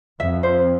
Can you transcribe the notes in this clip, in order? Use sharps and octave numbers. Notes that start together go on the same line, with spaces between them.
F2 E5
C5